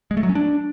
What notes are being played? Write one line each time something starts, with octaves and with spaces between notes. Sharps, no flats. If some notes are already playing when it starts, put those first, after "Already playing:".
G#3
A3
F#3
C#4
D4